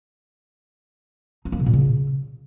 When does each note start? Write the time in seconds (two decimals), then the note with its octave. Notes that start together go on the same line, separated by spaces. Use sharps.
1.45 D#4
1.52 A#3
1.59 C3
1.66 A#2
1.73 C#3